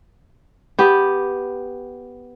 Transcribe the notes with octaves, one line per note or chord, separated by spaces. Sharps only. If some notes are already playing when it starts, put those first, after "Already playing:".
B3 G4